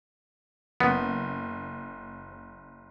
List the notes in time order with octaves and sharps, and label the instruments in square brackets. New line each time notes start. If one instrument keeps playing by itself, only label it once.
[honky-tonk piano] F#1 [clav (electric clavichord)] B3